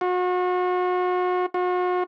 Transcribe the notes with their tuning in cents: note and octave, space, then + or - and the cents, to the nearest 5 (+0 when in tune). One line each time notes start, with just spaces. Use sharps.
F#4 -35
F#4 -40